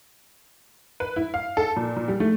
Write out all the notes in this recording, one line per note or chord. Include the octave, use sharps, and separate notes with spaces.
B4
E4
F5
A4
A#2
A#2
G3
A3